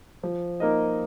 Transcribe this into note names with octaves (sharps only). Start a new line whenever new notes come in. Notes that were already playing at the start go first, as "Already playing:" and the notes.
F3
A#3 D#4 A#4 D#5